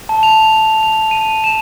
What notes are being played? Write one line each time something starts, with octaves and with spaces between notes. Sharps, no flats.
A5
F7
F7
D#7
E7